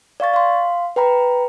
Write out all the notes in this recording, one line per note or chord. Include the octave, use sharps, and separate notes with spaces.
D5 F5 C#6 A6
F5 C6
B4 G5 A#5 B5